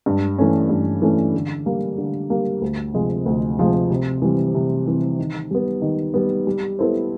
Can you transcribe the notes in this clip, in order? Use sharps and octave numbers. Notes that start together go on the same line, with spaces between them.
G2
E3 A3 C#4
G2
E3 A3 C#4
D3
G3 A#3
D3
G3 A#3
D2
C3 F3 G#3
D2
C3 F3 G#3
C3
E3 G3 C4
C3
E3 G3 C4
D#3
G3 B3
D#3
G3 B3
G3
B3 E4 A4 C5